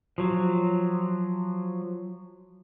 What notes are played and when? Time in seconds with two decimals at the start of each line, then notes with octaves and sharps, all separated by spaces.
0.18 F3 F#3